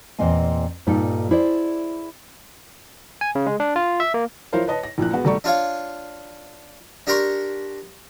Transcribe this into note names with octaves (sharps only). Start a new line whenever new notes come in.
E2 A#2 C4 D#5 G#5
G2 A#2 G3 D#4 A4
E4 G#4 C5 D5
G#5
C#3
G#3
D4
F4
E5
A#3
F3 E4 A#4 C5 C#5 F5
B4 C#5 D#5 A5
A#6
A#1 A#2 E3 F#6
G#3 B3 F#4
G#1 G3 A3 D5 A#5 C#6
D4 F4 C#5 F5
D4 G4 A#4 A#5 C6 C#6